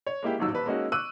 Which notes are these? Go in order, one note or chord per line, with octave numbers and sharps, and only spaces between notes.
C#5
G#3 A#3 E4 G4
D#1 A1 G#2 F#3 E6
D#1 B4
G#3 A#3 C#4 D#4 F#4
C#6 D6 E6 F#6 D#7